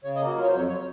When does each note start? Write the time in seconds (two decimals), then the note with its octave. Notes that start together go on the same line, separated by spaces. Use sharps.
0.04 C#3 C#5
0.16 D#5
0.21 A#3
0.26 F#4
0.37 F#3 F4
0.43 C#5
0.48 C5
0.53 F2
0.59 C#5
0.69 C#5